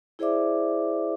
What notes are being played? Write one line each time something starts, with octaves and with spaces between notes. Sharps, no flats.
E4 G#4 C5 D5 E5 D6